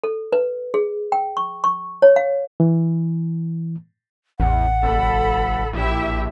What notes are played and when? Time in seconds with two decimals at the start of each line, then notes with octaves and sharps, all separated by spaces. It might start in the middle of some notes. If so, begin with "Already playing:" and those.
0.04 A4
0.32 B4
0.74 G#4
1.12 G5
1.37 C#6
1.64 C#6
2.02 C#5
2.16 F5
2.60 E3
4.40 A1 E2 F#5
4.83 F#1 A4 B5
5.73 A#1 E4 G4 E5